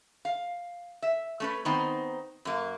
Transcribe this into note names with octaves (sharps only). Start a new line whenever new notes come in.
F5
E5
A3 C#4 B4
D#3 B3 C4 D#4
F#2 A#3